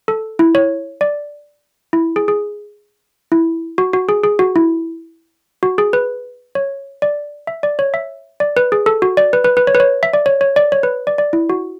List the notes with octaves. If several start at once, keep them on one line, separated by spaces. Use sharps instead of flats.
A4
E4
C#5
D5
E4
G#4
G#4
E4
F#4
F#4
G#4
G#4
F#4
E4
F#4
G#4
B4
C#5
D5
E5
D5
C#5
E5
D5
B4
G#4
A4
F#4
D5
B4
B4
B4
C#5
B4
C#5
E5
D5
C#5
C#5
D5
C#5
B4
D5
D5
E4
F#4